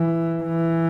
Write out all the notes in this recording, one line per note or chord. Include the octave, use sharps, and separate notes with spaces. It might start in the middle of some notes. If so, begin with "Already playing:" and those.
Already playing: E3
E3